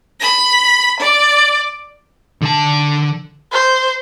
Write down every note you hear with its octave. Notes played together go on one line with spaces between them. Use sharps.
B5
D5
D3 A5
C5